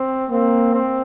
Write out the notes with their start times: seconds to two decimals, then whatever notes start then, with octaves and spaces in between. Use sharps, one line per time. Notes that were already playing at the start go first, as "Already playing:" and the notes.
Already playing: C4
0.30 A#3 C4
0.73 C4